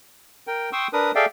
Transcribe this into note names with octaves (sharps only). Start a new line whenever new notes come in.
A#4 G5
G5 C6 C#6 D#6 E6
D4 A#4 B4 D#6
G#4 A4 D5 E5 F5 G5